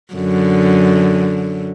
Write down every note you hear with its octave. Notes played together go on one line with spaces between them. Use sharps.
F#2 D3